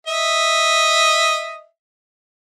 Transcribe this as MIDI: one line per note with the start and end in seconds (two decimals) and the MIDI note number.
0.07 1.65 75
0.07 1.65 76